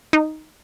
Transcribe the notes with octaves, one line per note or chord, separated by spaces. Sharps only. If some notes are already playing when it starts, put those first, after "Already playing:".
D#4